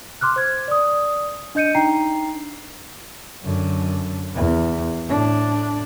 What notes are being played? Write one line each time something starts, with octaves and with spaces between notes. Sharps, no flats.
C6 D6 F6 F#6
C5 G#6
D5 D#6
D4 D#5 G6 C#7 D#7
D4 D#4 G5 A#5 C7
F#2 D3
E2
A2 D4